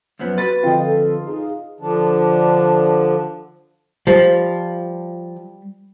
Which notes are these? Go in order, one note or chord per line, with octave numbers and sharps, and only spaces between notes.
F#2 F3 B3
F#4 B4 A6
D3 F3 C4 F4 D#5 G5
A4
D#4 G#4
D3 F3 D4
F3 G3